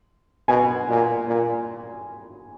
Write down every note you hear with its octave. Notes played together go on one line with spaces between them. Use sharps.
B2 G#5
A#2
A#2